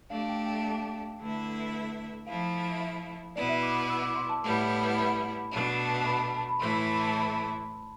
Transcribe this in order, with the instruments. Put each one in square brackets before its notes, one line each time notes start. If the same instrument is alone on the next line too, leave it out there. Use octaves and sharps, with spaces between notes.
[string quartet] A3 D4 G4 [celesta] F5
[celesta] F5
G5
G5
A5
[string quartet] D3 A3 E4 B4 E5
[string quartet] F3 A3 E4 [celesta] F5
[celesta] E5
[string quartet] B2 B3 E4 B4 [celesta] D5
[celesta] E5
D6
E6
D6
C6
A5
[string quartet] A2 G3 B3 E4
[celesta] B5
[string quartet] B2 A3 D4
[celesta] B5
A5
B5
[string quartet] A2 E3 A3 E4 [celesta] C6
[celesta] B5
B5
A5